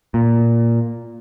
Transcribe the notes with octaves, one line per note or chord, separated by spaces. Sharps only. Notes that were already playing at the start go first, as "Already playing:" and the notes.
A#2